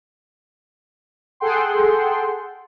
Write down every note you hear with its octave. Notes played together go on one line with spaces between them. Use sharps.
G#4 A4 F#5 G5 C6